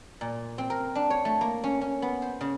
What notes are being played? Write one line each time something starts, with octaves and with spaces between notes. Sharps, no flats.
A#2
C4
A#4
D4
C#5
A3
A#3
C#4
C#4
B3
C5
C#3